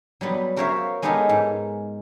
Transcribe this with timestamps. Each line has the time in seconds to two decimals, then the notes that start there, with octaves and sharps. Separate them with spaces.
0.21 F#3 G3 B3
0.56 F#4 A#4 C5 C#5 E5 F5
1.02 G#3 B3 D#4 G4 A4 A#4
1.29 G#2